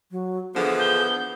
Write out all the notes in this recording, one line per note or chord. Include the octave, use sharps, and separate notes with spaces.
F#3
D3 E3 F3 B3 G#4
G6